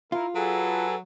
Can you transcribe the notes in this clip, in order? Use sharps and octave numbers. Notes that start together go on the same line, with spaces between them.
E4 F4 A#4
F#3 G#4 A4 B4